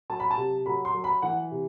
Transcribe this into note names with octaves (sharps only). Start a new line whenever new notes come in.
F#3 A5
B5
A5
C3
F#3 B5
C6
F#3
B5
E3 F#5
C3